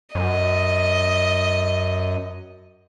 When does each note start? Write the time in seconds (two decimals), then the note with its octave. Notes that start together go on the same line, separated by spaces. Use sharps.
0.15 F#2 D#5